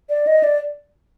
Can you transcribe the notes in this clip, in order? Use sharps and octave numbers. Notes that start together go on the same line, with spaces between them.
D5
D#5
D5